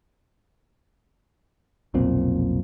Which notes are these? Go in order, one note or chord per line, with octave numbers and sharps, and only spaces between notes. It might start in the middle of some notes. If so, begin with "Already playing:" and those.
F1 B1 A#2 C4